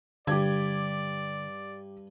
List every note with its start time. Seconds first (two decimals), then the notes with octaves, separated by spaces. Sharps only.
0.27 G2 D3 G4 D5 G#6